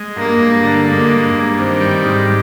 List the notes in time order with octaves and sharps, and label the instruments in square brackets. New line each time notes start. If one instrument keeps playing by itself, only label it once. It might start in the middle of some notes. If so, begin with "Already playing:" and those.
Already playing: [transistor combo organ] G#3
[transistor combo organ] G2 [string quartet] A#3
[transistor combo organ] G2
D3
[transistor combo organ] G#3 [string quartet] A#3
[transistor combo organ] G2
G2
[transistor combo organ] D#3 [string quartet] C4
[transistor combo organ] G3
G#2